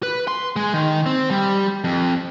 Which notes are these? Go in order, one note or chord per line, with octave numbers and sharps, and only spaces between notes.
B4
C6
G#3
D#3
C4
G3
F2